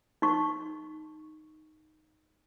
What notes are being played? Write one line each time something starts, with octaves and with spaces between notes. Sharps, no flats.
D#4 C#6